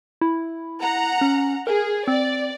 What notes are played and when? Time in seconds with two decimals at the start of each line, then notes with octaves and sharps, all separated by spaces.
0.21 E4
0.80 F#5 A#5
1.21 C#4
1.67 G#4 A#4
2.07 C4 D5